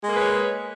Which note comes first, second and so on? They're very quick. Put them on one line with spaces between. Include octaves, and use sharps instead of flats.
G#3 A#3 G#4 B4 C#5